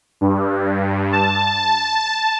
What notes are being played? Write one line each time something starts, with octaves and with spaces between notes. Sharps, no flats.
G2
A5